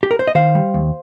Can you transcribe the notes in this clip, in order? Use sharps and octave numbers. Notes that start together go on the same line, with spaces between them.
G4
A#4
C5
D#5
D#3 C5 F5
G3
D#2